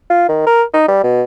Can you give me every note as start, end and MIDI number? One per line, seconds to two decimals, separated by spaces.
0.10 0.25 65
0.29 0.44 51
0.47 0.63 70
0.74 0.88 63
0.88 1.03 55
1.03 1.22 47